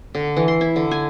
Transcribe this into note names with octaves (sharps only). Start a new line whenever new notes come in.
D3
E3
C6
E4
D3
G#5